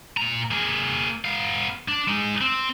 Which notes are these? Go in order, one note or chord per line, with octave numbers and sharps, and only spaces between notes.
A#2 A#5
A#3 G#4
B3 F5
D4
G#3 D#4
C4